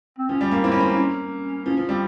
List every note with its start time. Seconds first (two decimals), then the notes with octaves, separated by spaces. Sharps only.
0.19 C4
0.29 F3 C#4
0.41 G3
0.51 A#3
0.63 C4 E4
0.72 C#4
0.80 C4
0.90 A#3
0.98 C#4
1.66 F3 C#4
1.77 F3 C#4
1.89 G3 C4